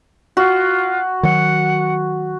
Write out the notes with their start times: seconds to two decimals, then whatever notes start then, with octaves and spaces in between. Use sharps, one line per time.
0.37 F4 F#4
1.23 D#3 F#3 F#5